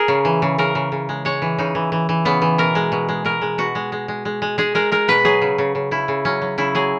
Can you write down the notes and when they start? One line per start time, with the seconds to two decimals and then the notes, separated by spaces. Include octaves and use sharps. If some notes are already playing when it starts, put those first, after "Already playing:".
Already playing: G#4 A#4
0.08 C#3
0.25 E3
0.42 C#3
0.58 C#3 A#4
0.75 C#3
0.92 C#3
1.09 G#3
1.25 G#3 C#5
1.42 E3
1.58 C#3 D#4
1.75 E3
1.92 E3
2.09 E3
2.25 C#3 B3
2.42 E3
2.58 B2 A#4
2.75 G#3
2.92 B2
3.09 G#3
3.25 B2 A#4
3.42 G#3
3.58 B2 F#4
3.75 G#3
3.92 G#3
4.08 G#3
4.25 G#3
4.42 G#3
4.58 G#3 G#4
4.75 G#3 A#4
4.92 G#3 A#4
5.08 B2 B4
5.25 F#3 G#4
5.42 C#3
5.58 C#3
5.75 C#3
5.91 C#3 E4
6.08 C#3
6.25 F#3 C#4
6.42 F#3
6.58 C#3 E4
6.75 F#3 G#4